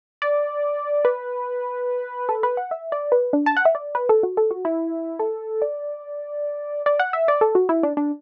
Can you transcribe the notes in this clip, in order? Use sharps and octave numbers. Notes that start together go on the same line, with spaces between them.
D5
B4
A4
B4
F#5
E5
D5
B4
D4
A5
F#5
E5
D5
B4
A4
F#4
A4
F#4
E4
A4
D5
D5
F#5
E5
D5
A4
F#4
E4
D4
D4